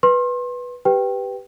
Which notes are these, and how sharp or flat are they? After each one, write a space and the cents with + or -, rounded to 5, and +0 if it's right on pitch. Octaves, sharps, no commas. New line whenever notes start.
B4 -10 C6 +30
G4 +0 B4 +0 G5 +0